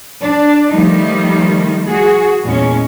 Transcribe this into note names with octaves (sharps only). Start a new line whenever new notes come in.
D4
D#3 F3 G3 A3 D#4
F#4 G#4
E2 A#2 G#3 C#4